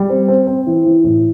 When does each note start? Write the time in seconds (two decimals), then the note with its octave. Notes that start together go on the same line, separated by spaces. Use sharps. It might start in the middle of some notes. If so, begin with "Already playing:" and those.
Already playing: G3
0.10 C4
0.28 C4
0.47 C4
0.67 E3
0.85 E3
1.04 A2